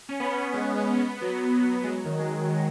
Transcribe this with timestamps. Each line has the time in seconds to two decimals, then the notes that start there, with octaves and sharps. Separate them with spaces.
0.09 C#4
0.20 B3
0.31 B3
0.43 B3
0.54 G#3
0.77 C#4
0.99 B3
1.21 F#3
1.84 G#3
1.90 F#3
2.05 D#3
2.19 G#3
2.50 D#3